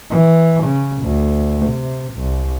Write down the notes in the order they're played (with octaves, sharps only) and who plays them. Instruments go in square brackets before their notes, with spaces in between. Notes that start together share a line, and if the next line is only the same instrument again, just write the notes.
[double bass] E3
C#3
D2
C3
C2